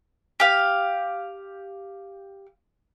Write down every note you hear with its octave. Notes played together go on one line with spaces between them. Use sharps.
G4 F5